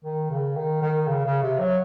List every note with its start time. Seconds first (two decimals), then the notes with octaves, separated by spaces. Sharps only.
0.05 D#3
0.31 C#3
0.57 D#3
0.82 D#3
1.07 C#3
1.26 C#3
1.42 C3
1.59 F#3